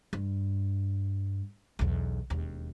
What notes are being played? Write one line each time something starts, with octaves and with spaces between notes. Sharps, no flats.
G2
B1 E2
E1 D#2